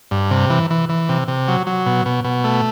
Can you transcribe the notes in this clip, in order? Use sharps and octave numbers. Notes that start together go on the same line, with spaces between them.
G2
C3
E3
E3
E3
C3
C3
F#3
F#3
B2
B2
B2
A3